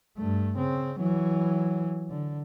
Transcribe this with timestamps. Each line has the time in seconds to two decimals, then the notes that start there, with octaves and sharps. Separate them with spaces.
0.18 G2 A3
0.57 C#3 C4
1.00 E3 F#3
2.10 D3